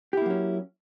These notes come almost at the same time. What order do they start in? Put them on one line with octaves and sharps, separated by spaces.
G4 E4 A#3 F#3 C#4